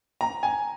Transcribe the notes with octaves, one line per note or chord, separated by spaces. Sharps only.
A#5
G#5